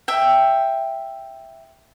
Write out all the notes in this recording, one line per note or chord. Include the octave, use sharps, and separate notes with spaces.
E5 G5